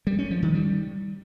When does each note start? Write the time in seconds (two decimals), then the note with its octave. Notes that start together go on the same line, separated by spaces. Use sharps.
0.07 G3
0.19 C#4
0.31 F3
0.42 D#3
0.54 G3